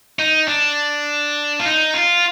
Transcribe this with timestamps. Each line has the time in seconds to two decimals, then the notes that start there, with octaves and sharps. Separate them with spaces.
0.19 D#4
0.48 D4
1.60 F4
1.65 D#4
1.94 F4